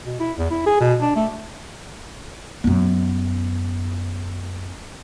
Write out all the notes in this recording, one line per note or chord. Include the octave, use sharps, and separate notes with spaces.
B2
E4
E2
E4
G#4
B2
D4
A3
F#2 B3